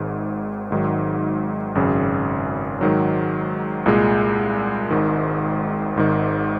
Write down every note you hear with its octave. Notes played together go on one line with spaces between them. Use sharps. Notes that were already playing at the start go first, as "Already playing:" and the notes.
Already playing: G#1 G#2 D#3
G#1 G#2 D#3 F#3
G#1 F#2 C#3
G#2 D#3 F#3
C2 A#2 G#3
G#1 G#2 D#3
G#1 G#2 D#3